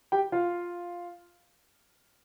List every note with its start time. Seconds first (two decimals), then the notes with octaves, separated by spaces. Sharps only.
0.12 G4 G5
0.32 F4 F5